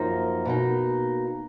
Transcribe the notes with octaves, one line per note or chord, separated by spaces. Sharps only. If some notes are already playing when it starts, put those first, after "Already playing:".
Already playing: F#2 F3 A#3 D#4
B2 A#3 D#4